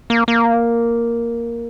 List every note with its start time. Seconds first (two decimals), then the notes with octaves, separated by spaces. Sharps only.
0.10 A#3
0.28 A#3